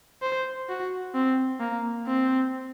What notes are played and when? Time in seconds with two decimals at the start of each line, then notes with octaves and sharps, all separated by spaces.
0.22 C5
0.69 F#4
1.14 C4
1.60 A#3
2.07 C4